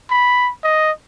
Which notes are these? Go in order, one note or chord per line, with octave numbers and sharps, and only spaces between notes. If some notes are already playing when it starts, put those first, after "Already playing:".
B5
D#5